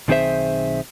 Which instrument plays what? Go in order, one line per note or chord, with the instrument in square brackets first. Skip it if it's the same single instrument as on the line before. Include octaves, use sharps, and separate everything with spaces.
[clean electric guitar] B1 D#3 C4 G#4 C5 E5